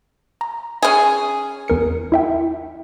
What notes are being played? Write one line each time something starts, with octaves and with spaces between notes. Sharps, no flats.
A#5
C#4 G#4
E2 A#4 C#7
E4 E5 G5